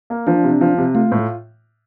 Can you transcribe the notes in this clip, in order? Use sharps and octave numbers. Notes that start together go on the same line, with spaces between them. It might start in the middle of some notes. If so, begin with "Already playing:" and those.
A#3
F3 D4
C3
F3
C3
A3 F4
A2